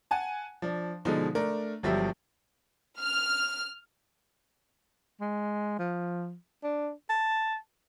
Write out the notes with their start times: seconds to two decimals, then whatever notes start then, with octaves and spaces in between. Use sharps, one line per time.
0.11 F#5 G#5 A5
0.62 F3 D4
1.05 B2 D3 F3 G#3 D#4
1.35 A3 D4 A#4
1.83 G1 G2 F3 F#3 G4 E5
2.99 F6
5.21 G#3
5.79 F3
6.63 D4
7.10 A5